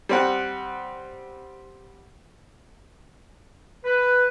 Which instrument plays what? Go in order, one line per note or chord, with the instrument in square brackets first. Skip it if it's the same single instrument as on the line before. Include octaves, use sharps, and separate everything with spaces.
[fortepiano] G3 C4 F#5
[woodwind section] B4